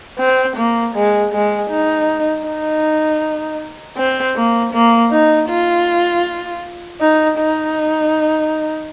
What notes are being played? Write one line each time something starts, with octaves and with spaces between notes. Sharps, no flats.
C4
A#3
G#3
G#3
D#4
D#4
C4
A#3
A#3
D#4
F4
D#4
D#4